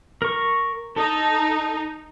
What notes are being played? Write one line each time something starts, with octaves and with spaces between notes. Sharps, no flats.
A#4 C#6
D#4 A4